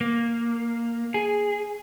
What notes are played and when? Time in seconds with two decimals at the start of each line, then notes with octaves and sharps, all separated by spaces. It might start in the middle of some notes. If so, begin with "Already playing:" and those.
0.01 A#3
1.14 G#4